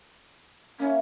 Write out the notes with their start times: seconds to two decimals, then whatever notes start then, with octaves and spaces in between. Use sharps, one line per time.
0.79 A#3 C#4 E4